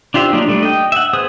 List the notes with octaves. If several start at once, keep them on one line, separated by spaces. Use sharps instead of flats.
D4 F4 G4 C5 E5
F#3 A#3 D4 D#4
G3 A3 D4
D#5 G5
E5 F#5
B3 G#4 C5 D#6